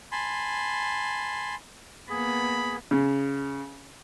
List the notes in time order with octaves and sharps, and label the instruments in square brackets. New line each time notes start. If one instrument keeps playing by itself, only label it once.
[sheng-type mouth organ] G#5 A5 B5 C6
[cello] A#3 B3 [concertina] G#4 [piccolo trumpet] B5
[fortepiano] C#3